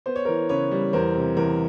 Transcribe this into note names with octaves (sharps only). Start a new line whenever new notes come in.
B3 C5
C#5
E3 A#4 C5
C#3 B4 C#5
G3
E2 A#4 C5
C3
E2 A#4